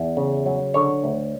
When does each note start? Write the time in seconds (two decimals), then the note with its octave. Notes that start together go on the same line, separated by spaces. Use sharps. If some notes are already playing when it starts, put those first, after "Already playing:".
Already playing: E2
0.17 C#3
0.46 F#3
0.74 D3 C#5
1.04 D2